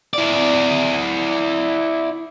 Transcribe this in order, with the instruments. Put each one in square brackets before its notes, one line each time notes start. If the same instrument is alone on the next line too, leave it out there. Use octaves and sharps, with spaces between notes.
[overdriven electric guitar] E4 D5